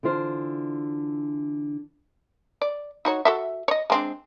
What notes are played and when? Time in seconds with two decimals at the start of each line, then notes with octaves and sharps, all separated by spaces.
0.03 D3 E3 D4 F4 C5
2.62 D5
3.05 D#4 F#4 C#5
3.25 F#4 A4 E5
3.68 C#5 D#5
3.90 G#3 C4 D4